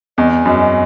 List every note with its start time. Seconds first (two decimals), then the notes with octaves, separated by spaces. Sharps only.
0.18 E2 D#5
0.45 F#2 D#5
0.59 D#5